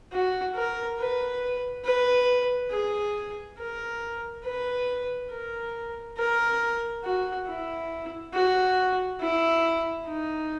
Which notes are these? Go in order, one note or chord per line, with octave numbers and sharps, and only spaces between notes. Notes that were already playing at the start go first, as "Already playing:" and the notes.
F#4
A#4
B4
B4
G#4
A#4
B4
A#4
A#4
F#4
E4
F#4
E4
D#4